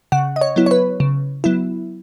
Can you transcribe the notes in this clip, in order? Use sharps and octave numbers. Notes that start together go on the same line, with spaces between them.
C#3 F#5
D#5
C#5
F#3 B3 E4
C#5
B4
C#3
F#3 B3 E4